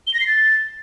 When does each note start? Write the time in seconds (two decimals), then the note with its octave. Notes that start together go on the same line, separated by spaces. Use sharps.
0.07 G7
0.14 A#6
0.20 C7
0.27 A6